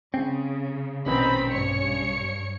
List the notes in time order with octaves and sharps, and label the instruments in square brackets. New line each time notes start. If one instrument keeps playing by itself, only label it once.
[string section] C#3 [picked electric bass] C4 [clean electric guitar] C#4
[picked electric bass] A#1 B2 [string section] D#3 C4 B5 [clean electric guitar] C#4
[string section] G2 C#5 C#7